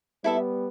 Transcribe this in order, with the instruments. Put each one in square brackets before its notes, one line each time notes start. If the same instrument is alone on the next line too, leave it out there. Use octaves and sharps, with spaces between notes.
[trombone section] G3 B3 [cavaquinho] E4 A4 E5